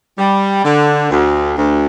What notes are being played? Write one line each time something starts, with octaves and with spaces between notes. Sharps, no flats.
G3
D3
D2
D2